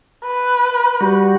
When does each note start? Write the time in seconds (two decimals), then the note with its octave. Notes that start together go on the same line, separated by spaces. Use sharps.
0.25 B4
1.01 G3 F#4